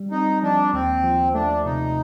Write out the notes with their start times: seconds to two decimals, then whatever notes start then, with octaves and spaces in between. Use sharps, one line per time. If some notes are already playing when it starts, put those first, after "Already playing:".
Already playing: G3
0.11 C4 D#4
0.43 F3 D4
0.73 D#2 C4
1.04 F3
1.34 A3 D4
1.65 C3 D#4